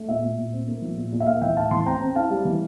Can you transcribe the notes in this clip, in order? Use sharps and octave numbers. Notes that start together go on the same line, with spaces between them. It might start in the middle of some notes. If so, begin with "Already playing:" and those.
Already playing: A3
A#2 E5
A#2
A#2
C4
A#3
F3
A#2
A#2
E5
A#3 F5
E3 E5 G5
A2 F5 A5
E3 A5 C6
C4 G5 A#5
C4
E4 F5 A5
G3
E3